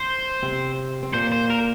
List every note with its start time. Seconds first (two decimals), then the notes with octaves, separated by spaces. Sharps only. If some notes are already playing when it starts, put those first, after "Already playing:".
Already playing: C5
0.43 C3 C4
1.03 C4
1.14 A#2 A#3 C5
1.32 C5
1.50 A#4